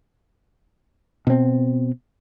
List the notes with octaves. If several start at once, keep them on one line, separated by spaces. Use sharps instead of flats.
B2 C4